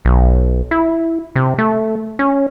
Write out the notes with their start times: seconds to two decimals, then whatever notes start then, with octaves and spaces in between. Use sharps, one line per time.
0.05 B1
0.71 E4
1.36 C3
1.58 A3
2.19 C#4